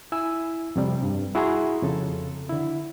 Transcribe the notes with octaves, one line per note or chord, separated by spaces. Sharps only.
E4 G#5 E6
F2 C3 G3
G2
E4 F#4 G#4 G#5 A#5 C6
F2 C#3 A4
D3 E4